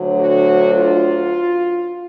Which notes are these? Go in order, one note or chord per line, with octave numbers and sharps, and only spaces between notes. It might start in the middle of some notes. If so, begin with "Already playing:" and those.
Already playing: D2 D3 F#3
F#4
F4